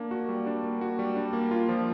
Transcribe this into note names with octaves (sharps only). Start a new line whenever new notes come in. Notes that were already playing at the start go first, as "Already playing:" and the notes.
Already playing: A#3 D4
F#4
G3
D4
A#3
F#4
G3
D4
A#3
F4
F3